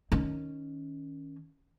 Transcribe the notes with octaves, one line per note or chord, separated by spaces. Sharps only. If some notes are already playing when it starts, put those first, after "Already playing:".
D#3 C#4